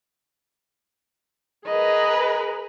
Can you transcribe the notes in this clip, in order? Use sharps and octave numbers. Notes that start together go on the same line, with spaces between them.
G#4 A#4 B4 D#5